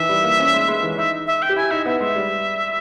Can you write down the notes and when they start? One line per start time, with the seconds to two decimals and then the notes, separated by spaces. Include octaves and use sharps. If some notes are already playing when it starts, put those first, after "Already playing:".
Already playing: D#3 E3 E5
0.09 G3
0.24 A#3
0.39 C#4
0.54 G#3
0.68 G#3
0.82 E3
0.97 D#4 E5
1.27 E5
1.42 G5
1.49 G4
1.56 E4 G#5
1.71 D#4 E5
1.86 B3 E5
2.00 G#3 E5
2.16 G3